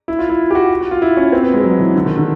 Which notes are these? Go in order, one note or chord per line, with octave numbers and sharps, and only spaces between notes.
E4
F4
E4
G4
F#4
F#4
F4
E4
C#4
C4
B3
G#3
F#3
E3
D3
D#3
D3